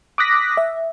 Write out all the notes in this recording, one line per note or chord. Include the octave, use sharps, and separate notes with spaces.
D6 D#6 F#6 A#6 B6
E5